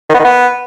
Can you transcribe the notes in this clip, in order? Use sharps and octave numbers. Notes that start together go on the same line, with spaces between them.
D#3
B3
D#3
B3